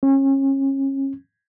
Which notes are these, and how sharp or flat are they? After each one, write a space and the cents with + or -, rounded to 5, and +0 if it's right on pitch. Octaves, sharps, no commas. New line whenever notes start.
C#4 -30